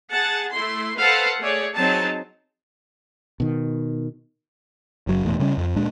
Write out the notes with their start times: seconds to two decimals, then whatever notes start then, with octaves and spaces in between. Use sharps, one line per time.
0.11 G#4 F#5 A5
0.51 A3 E4 C6
0.98 A4 B4 C5 F5 F#5 A5
1.40 A3 G#4 C#5 D5
1.76 F#3 C4 D#4 G#4 A5
3.40 B2 D#3
5.07 F#1 F#3
5.25 E1 E2 A2
5.40 C#3 G3 C#4
5.57 F2
5.76 D1 A#2 G#3 D4